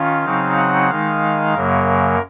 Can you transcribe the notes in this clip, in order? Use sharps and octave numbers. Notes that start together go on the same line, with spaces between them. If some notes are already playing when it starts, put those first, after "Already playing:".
Already playing: D#3 C#4 F4 F5
C#3 F#3 C4 D#4
F#5
D#3 G#3 D#4 F5
F#2 C#3 F#3 A#3 A#4